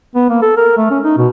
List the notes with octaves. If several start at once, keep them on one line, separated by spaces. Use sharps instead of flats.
B3
A#3
A4
A#4
A3
C#4
D#4
B2